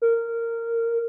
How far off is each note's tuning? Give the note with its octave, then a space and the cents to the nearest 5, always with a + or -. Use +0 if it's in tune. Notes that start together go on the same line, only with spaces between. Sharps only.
A#4 -15